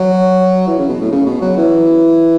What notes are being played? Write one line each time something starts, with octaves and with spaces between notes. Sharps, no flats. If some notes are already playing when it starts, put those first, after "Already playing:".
Already playing: F#3
E3
C#3
B2
A2
C#3
B2
F#3
E3